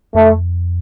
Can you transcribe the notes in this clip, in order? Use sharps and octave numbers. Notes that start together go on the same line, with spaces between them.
F2 A3